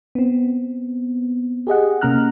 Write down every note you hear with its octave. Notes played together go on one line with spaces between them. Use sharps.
B3 C4
G4 G#4 D#5 F#5
C3 A#3 C#4 A#5 F6 F#6